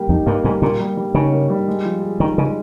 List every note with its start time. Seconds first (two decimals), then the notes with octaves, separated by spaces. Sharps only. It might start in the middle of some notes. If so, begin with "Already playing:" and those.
Already playing: G3 A#3 G4
0.09 F2 D#4
0.26 G2 A#3
0.44 G#2 G3
0.62 A#2 A#3
0.80 G3
0.97 G3
1.14 C#3 D#4
1.32 A#3
1.50 G3
1.68 G#3
1.85 F3
2.02 G#4
2.20 D#3 D#4
2.38 C#3 G#3